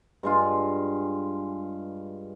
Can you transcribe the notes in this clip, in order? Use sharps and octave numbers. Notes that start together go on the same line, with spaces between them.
G2 G#3 F4